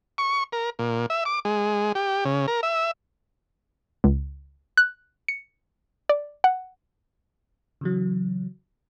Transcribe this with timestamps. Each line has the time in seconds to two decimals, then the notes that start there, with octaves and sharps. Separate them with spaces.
0.18 C#6
0.52 A#4
0.79 A#2
1.10 E5
1.25 D6
1.45 G#3
1.95 G4
2.25 C#3
2.48 A#4
2.63 E5
4.04 C#2
4.77 F#6
5.28 C#7
6.09 D5
6.44 F#5
7.81 C#3 E3 F#3